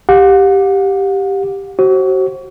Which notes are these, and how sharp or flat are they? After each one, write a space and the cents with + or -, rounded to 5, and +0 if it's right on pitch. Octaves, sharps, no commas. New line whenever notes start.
G4 +0 F#5 -45
F#4 +35 C5 +35